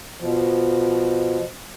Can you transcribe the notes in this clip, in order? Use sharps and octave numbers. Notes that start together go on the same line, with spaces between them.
B2 F3